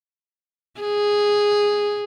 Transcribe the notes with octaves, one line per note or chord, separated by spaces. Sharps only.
G#4